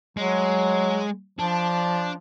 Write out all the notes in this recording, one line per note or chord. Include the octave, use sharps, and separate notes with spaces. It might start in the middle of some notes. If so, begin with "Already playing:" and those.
F#3 G#3
F3 D4